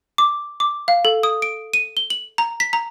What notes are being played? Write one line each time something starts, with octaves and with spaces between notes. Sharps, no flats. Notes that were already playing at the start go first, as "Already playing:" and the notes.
D6
D6
F5
A4
D#6
D7
D#7
G7
F#7
A#5
B6
A#5